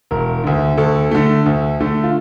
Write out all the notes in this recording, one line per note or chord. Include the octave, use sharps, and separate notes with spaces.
E1 A#4
D2 D3
D2 A4
D3 A3
D2
D3 A3
F4